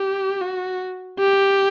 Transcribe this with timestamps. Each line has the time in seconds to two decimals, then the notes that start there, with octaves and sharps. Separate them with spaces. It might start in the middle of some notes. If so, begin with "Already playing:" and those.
Already playing: G4
0.41 F#4
1.20 G4